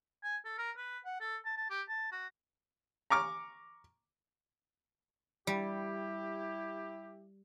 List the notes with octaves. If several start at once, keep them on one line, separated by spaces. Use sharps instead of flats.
G#5
A4
A#4
B4
F#5
A4
A5
A5
G4
A5
F#4
A#5 C#6 D6 F6
G3 E4 G4